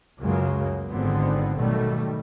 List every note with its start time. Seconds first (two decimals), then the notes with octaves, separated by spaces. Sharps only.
0.21 C#2 F#2 C#3 F#3 G#3 A#3
0.90 G#1 G#2 D3 F3 B3 C4
1.57 B2 D#3 F#3 G3 A3